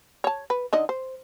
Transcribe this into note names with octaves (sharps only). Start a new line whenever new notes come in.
C#5 A5
B4
D3 D#4 D#5
C5